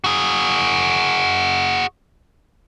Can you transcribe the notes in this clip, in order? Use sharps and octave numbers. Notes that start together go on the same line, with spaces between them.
F#4 G#4